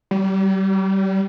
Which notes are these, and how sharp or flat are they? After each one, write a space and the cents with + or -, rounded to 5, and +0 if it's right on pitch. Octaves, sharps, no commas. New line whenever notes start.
G3 -30